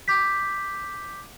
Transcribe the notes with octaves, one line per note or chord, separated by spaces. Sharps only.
D6 G6 B6